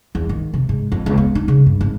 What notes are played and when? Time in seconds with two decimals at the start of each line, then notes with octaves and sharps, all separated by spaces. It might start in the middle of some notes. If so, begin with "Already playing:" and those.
0.15 E2
0.29 D#3
0.53 C3
0.69 G#2
0.92 F2
1.06 C#2
1.18 B3
1.35 D#4
1.48 C#3
1.66 G2
1.81 G#1